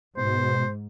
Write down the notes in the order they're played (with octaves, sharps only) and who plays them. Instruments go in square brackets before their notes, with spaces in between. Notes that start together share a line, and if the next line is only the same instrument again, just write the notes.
[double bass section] G#2 [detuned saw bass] B2 [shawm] C5